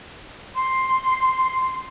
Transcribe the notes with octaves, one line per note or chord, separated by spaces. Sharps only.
C6